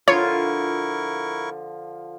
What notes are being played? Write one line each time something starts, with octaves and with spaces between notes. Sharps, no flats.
D3 F3 E4 F4 A#4 C#5 C#6